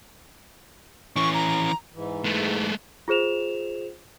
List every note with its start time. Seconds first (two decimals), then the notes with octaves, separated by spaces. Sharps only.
1.16 E3 C#4 C#6
1.34 A#5
1.95 G#2 E3
2.24 G#3 A3
3.08 F4 G#4 C5 E7 F7